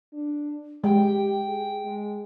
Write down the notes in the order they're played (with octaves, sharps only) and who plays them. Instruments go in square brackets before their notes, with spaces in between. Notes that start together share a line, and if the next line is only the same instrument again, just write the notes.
[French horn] D4
[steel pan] G#3 [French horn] G4 [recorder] G5
[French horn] G#4
G#3